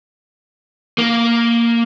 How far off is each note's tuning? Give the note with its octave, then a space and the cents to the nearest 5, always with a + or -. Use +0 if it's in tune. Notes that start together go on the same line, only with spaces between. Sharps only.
A#3 -5